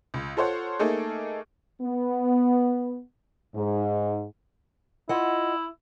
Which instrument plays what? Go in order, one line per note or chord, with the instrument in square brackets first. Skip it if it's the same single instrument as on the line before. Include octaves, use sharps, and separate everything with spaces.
[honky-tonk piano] C#2
F4 A4 C5 C#5 F#5
A3 A#3 D#4 G#4 A4
[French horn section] B3
G#2
[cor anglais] E4 [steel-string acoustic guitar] F4 D#5 F#5